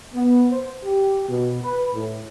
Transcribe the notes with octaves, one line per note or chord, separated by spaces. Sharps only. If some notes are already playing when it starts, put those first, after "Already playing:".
B3
C5
G4
B2
B4
A2